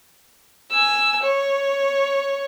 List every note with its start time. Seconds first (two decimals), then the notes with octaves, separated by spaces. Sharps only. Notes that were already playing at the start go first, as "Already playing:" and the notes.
0.70 G#5 E6
1.22 C#5